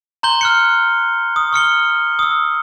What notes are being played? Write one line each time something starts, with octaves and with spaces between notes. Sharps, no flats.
A#5 C6 G6 G7
F6 F#6 C#7
D#6
C#6 F6 C#7 G7
D#6 E6